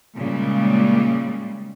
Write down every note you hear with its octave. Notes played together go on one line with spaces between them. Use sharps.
A#2 C#3 G3 G#3